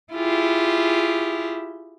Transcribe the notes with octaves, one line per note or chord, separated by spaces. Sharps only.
E4 F4 G4 G#4